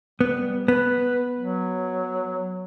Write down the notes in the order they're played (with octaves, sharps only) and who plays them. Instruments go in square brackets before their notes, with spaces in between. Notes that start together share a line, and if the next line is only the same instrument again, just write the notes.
[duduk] G3 [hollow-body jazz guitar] B3
[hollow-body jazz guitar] B3 [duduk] B4
[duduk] F#3